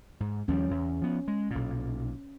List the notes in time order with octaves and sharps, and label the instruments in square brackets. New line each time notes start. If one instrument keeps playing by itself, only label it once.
[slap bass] G#2
[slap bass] D#2 F3 G3 [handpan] C#4
[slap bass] E2
F3 B3
G#3
B1 A#2